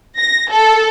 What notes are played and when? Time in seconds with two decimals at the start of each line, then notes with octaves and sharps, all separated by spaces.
0.18 A#6
0.51 A4